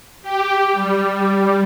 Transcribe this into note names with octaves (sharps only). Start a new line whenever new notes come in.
G4
G3